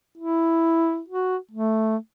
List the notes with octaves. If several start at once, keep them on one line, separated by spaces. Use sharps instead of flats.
E4
F#4
A3